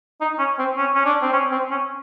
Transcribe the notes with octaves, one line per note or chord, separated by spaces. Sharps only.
D#4
C#4
C4
C#4
C#4
D4
C4
C#4
C4
C#4